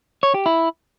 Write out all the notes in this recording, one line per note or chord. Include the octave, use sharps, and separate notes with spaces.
C#5
G4
E4